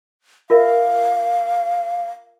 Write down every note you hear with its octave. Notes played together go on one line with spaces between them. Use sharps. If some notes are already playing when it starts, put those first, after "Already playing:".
F4 A#4 E5 F5